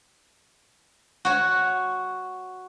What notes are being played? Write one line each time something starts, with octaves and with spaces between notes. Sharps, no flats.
F#4 C#5